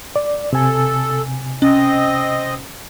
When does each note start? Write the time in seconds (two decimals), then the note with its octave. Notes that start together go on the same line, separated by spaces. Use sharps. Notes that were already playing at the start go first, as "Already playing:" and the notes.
0.16 D5
0.53 C3 A4 G#5
1.62 C4 C#4 D#5